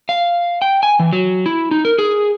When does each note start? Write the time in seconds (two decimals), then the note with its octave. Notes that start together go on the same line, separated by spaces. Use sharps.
0.09 F5
0.62 G5
0.83 G#5
0.99 E3
1.13 F#3
1.46 E4
1.71 D#4
1.85 A#4
1.99 G#4